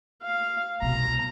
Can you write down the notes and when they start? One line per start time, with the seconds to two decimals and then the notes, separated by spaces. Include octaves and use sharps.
0.22 F5
0.82 C2 B2 A#5